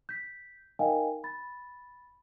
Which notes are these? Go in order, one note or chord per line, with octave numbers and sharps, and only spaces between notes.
G6 B6
D#4 A#4 D#5 F5 G5 G#5
B5 A6